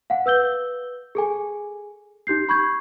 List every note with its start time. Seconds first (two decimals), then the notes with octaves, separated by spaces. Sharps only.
0.10 F5 F#5
0.26 B4 E6 G6 G7
1.15 G#4 A4 G#5
2.27 D#4 G4 G6 C7
2.49 B5 C#6 G6 G#6